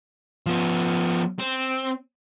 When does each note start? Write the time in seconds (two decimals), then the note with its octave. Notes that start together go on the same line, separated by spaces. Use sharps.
0.46 F3 B3
1.39 C4